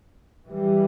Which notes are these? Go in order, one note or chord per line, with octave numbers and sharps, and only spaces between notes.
E3 G3